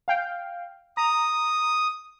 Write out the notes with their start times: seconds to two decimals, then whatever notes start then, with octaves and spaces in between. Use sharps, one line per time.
0.08 F5 G5
0.97 A#5 D#6